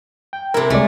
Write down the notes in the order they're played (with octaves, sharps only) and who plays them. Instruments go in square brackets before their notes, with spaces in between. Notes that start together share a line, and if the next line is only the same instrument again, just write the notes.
[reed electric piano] G5
[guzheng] C3 E4 [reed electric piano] A4 A#4
[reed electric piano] C2 G#3 D5 [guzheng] A3